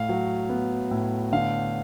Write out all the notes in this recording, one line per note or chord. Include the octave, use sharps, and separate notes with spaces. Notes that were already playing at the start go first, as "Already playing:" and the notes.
Already playing: A2 F5
F#3
B3
A2
D3 F5